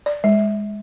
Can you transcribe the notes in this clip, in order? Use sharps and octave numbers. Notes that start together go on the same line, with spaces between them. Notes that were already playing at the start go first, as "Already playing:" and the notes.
D5
G#3